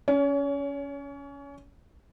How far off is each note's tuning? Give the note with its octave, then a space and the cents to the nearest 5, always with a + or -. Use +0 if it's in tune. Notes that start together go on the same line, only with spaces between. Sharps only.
C#4 +15 C#5 +35